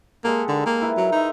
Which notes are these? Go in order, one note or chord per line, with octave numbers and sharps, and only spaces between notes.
G#3 A#3 G4 A4
D3 D#3
A#3
E4 A#4 B4
F#3
D#4 C5 E5